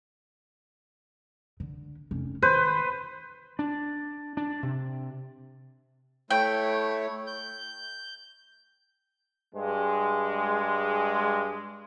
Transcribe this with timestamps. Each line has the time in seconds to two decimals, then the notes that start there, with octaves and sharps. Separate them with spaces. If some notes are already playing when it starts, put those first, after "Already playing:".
1.60 D3
2.11 F1 C#4
2.42 D#3 B4 C5
3.59 D4
4.37 D4
4.63 C3
6.30 A3 E4 C#5 G5
7.27 G6
9.53 G2 G#3